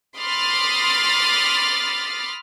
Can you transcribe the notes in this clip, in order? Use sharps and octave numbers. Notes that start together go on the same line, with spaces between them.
B5 C6 D6 D#6 F6 A6